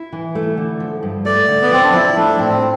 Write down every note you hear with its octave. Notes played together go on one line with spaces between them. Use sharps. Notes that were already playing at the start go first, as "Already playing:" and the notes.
Already playing: E4
E3
A3
D3
F3
G2
A3 D5
D3
B3
F3 C4
D4
F3 E4
A3 D4
A2 C4